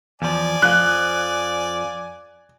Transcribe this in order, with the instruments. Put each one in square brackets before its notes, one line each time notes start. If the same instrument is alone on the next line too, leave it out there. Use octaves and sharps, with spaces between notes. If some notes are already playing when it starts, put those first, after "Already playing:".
[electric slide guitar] E2 F3 [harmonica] D5 G#5
[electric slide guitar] F2 F3 [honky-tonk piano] F#6